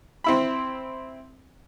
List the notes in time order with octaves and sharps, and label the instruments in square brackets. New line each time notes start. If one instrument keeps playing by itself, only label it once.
[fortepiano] C4 E4 B5